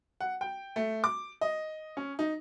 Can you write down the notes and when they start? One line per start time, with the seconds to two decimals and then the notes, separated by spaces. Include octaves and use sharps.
0.21 F#5
0.41 G5
0.76 A3
1.04 D6
1.41 D#5
1.97 C#4
2.19 D#4